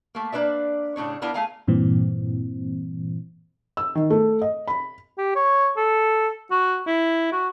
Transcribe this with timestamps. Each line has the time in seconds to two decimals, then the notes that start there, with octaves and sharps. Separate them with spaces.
0.15 A3 A#3
0.32 A#3 D4 B4 D5 E5
0.96 A2 C#3 D4 C#5
1.22 B3 D4 E4 F4 A#4
1.34 A3 G#4 F5 G#5 A#5
1.68 G2 A#2 E3 C4
3.77 E6
3.95 D#3
4.10 A3
4.42 D#5
4.68 B5
5.18 G4
5.35 C#5
5.77 A4
6.51 F#4
6.87 E4
7.32 F#4